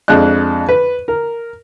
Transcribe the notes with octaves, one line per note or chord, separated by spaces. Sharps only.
F2 G#3 D4 F#6
B4
A#4